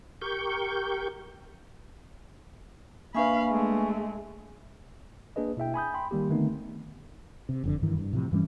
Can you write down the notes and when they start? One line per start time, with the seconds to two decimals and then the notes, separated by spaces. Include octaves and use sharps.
0.21 G4 A#4 C#6 G6
3.15 A#3 D4 B4 E5 F5 G#5 B5 C#6
3.50 G#3 A3
5.36 A#3 D4 G#4 B4 D#5
5.57 B2 E4 E5 G5
5.74 G#5 B5 D#6 G6
5.94 G5 B5 C6
6.11 D#3 G3 A#3 G4
6.29 D3 D#3 A3 B3 C4 D#4
7.49 C3
7.64 F#1 F2 D3
7.83 G2 D#3 E3
7.98 G2
8.13 A2 C3 F3
8.32 G2 E3 G3 C#4